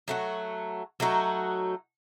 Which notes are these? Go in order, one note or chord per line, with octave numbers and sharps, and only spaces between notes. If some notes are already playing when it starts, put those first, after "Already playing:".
F#3 A3 D#4 F#4
F#3 A3 D#4 F#4